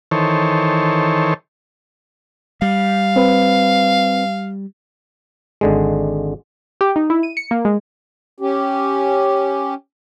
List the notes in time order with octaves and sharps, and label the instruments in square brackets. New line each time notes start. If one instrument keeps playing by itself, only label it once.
[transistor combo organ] D#3 E3 A4 C5 C#5
[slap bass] G3 [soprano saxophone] F5
[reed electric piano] C4 B4
[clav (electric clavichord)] G#1 D3 G#3
[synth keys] G4
D#4
E4
D#7
C#7
A#3
G#3
[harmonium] C#4 G4